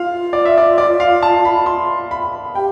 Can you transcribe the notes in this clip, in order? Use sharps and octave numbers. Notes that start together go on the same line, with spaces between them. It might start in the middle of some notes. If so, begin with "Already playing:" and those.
Already playing: F4 F5
D5
E5
D5
D5
F5
A5
B5
C6
B5
G4 G5